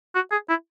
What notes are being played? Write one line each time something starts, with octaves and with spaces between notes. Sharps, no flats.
F#4
G#4
E4